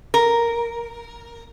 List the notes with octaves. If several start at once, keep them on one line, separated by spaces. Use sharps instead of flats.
A#4